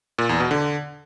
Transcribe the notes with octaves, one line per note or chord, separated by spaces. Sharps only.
A#2
E2
B2
D3